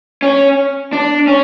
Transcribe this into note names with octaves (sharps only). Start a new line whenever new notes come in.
C#4
D4
C#4